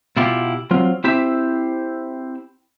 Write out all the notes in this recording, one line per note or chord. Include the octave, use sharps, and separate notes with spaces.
B2 E4 F4 G4
F#3 C4 F4
C4 E4 G4 C5 E5